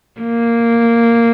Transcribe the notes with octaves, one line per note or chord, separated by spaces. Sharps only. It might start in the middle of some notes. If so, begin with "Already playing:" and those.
A#3